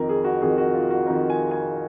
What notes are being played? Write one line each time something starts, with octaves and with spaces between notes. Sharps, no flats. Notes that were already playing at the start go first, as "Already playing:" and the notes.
Already playing: F2 D#3 A#4
G#4
F#4
F2 D#3 G#4
F#4
F4
F#4
F2 D#3 A#4
G#5
G#5